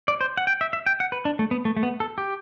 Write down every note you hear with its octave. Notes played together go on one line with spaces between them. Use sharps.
D5
C5
F#5
G5
E5
E5
G5
F#5
B4
D4
A3
B3
A3
A3
B3
A4
G4